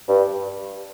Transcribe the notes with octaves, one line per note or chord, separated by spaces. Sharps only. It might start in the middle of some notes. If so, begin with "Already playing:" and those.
G2